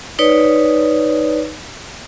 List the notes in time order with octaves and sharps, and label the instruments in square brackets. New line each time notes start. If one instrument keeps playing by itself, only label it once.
[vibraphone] D#4 B4 C#5 D5